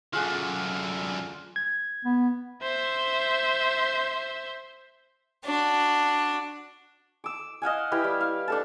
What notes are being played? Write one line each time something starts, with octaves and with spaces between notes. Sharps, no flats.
F#2 D3 F4 G#4 F#5
G#6
B3
C5 E5
D4 F#4
D6 E6
D#5 F5 F#5 G#5
E4 G4 B4 F5
G3
F5
D4 A4 A5